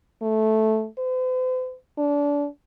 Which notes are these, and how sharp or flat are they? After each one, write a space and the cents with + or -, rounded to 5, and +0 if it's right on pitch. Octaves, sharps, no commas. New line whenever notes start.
A3 -10
C5 -45
D4 -25